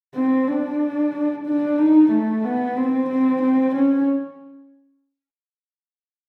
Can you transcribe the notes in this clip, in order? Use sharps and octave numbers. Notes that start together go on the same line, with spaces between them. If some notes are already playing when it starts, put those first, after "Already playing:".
C4
D4
D4
D#4
A3
B3
C4
C4
C4
C#4